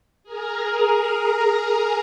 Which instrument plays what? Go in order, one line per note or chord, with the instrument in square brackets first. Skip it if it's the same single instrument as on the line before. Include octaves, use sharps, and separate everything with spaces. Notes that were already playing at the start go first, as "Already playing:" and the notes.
[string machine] G#4 A#4 A#5